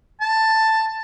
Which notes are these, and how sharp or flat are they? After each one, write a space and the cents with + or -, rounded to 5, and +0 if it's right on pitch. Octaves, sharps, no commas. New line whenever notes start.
A5 +10